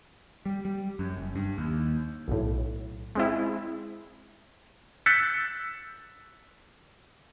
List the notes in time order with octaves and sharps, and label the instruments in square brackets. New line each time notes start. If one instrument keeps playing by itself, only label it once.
[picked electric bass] G3
G3
F#2
F#1
G2
D#2
[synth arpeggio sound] B1 A2
G#3 C4 E4
[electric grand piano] E6 F#6 G6 A6 B6 C#7